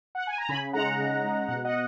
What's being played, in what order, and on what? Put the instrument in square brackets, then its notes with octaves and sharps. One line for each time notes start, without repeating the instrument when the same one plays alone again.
[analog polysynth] F#5
G#5
A#5
C#3 G#5 B5
G#3 D#4 F#5 A#5
C#3
G#3 D#4
B2 F#5 A#5
D#5 F#5